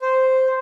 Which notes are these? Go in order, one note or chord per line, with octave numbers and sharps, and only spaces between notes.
C5